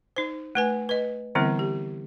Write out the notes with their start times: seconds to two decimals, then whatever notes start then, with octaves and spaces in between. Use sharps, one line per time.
0.16 D#4 C5
0.55 A3 B4 G#5
0.89 B4 D#5
1.35 D3 E3 G3 B3 C4 E4
1.59 G4